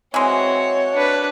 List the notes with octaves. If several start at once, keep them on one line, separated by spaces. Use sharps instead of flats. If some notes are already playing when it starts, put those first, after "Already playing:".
E3 G#3 C4 F#4 C#5
D4 B4